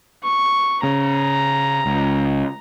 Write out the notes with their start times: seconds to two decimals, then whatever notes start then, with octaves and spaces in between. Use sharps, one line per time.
0.23 C#6
0.83 C#3 A#5
1.86 C#2